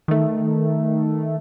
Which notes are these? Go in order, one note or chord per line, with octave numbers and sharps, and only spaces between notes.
D#3 A3